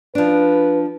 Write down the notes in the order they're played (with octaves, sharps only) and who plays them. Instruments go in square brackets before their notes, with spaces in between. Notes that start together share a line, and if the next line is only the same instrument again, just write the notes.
[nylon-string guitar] F3 D4 [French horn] B4